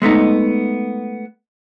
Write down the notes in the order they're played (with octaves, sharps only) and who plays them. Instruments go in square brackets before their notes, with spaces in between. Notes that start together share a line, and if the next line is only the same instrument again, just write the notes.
[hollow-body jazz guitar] G#3 A3 B3 D#4